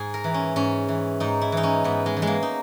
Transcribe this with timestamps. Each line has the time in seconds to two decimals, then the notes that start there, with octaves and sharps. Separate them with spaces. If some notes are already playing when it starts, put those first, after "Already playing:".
Already playing: G#2 G#4
0.14 A#4
0.24 E3
0.34 C#4
0.56 G#2 C#4
0.88 E3
1.20 G#2 D#4
1.41 E4
1.52 E3 D#4
1.63 C#4
1.84 G#2 B3
2.06 G#3
2.16 E3
2.22 G#3
2.27 A#3
2.42 D#4